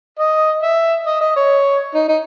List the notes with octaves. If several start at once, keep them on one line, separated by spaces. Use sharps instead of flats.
D#5
E5
D#5
D#5
C#5
D#4
D#4